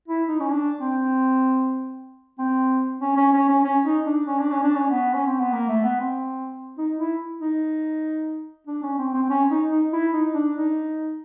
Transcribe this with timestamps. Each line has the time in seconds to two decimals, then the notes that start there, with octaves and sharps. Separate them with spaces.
0.08 E4
0.29 D#4
0.40 C#4
0.50 D4
0.81 C4
2.39 C4
3.02 C#4
3.17 C#4
3.33 C#4
3.49 C#4
3.64 C#4
3.86 D#4
4.07 D4
4.27 C#4
4.40 D4
4.52 C#4
4.64 D4
4.76 C#4
4.91 B3
5.14 C#4
5.27 C4
5.40 B3
5.53 A#3
5.69 A3
5.84 B3
6.00 C4
6.78 D#4
7.00 E4
7.42 D#4
8.67 D4
8.83 C#4
8.99 C4
9.14 C4
9.30 C#4
9.51 D#4
9.72 D#4
9.93 E4
10.14 D#4
10.35 D4
10.56 D#4